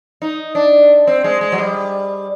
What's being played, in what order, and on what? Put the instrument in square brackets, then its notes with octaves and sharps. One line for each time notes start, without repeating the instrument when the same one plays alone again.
[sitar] D#4
D4
C4
G#3
G#3
F#3
G3